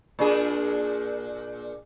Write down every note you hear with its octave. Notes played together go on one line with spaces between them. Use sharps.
A#2 D4 G#4